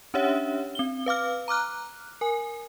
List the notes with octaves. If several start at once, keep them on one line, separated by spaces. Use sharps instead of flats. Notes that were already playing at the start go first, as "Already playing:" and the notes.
C#4 D4 G4 C#5 E5 F#5
C4 G7
B4 F5 D6 F6
A#5 D6 F6 F#6
A#4 G#5